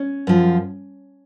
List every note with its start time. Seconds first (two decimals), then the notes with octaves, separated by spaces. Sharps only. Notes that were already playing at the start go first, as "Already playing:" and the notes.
Already playing: C#4
0.27 F#2 F3